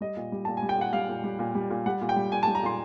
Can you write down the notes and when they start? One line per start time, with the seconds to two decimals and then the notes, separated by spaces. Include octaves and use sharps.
0.01 G3 D#5
0.17 A#2
0.32 G3
0.45 A#2 A5
0.57 G#5
0.63 G3
0.69 G5
0.78 A#2 F#5
0.93 G3 F5
1.09 A#2
1.24 G3
1.39 A#2
1.55 G3
1.70 A#2
1.86 G3 F#5
2.01 A#2
2.09 G5
2.16 G3
2.32 A#2 G#5
2.43 A5
2.48 G3
2.55 A#5
2.63 A#2 C6